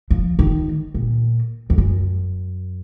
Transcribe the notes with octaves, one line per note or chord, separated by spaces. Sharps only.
F3
D#3
A#2
F2
F#2